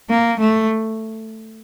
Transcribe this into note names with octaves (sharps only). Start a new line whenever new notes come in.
A#3
A3